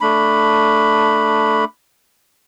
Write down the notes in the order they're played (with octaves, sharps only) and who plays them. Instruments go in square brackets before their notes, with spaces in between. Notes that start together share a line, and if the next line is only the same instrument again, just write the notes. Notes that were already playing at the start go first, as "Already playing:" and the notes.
[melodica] A3 D4 B5